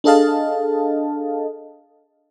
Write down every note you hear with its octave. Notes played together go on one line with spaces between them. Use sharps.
D4 G#4 A4 D#5 F5 A5